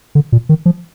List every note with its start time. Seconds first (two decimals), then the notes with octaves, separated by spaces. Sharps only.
0.15 D3
0.32 A#2
0.49 D#3
0.66 F3